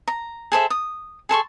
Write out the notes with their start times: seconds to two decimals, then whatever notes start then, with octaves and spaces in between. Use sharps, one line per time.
0.08 A#5
0.52 G#4 A4 C5 E5
0.70 D#6
1.29 G#4 A4 C6 C#6